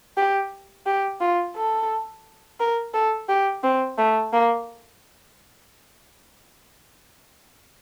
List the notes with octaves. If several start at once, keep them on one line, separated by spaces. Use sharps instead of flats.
G4
G4
F4
A4
A#4
A4
G4
C4
A3
A#3